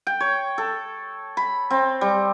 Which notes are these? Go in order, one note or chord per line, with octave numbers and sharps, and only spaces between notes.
G5
C#5
A4
B5
C4
G3